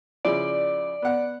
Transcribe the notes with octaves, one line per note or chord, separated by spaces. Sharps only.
C#3 F3 E4 D5
B3 F#5